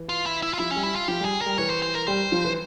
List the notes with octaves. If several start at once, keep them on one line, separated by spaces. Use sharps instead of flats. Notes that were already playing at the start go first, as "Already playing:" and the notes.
Already playing: E3
F4
E4
E4
F4
F3 E4
C#4
G3
E4
F4
F3 G4
G3 G#4
G3 A#4
E3 C#5
C5
C5
A#4
G3 C5
F3
E3